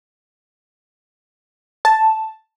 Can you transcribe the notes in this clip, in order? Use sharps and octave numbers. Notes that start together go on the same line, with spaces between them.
A5